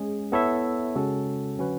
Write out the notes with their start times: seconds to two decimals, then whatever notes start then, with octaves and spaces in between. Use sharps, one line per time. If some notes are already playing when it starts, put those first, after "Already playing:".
Already playing: G#3 C#4 G#4
0.32 B3 E4 A4 C#5 E5
0.95 C#3 G#3 C#4 F#4 A4
1.58 D3 F#3 C#4 F#4 B4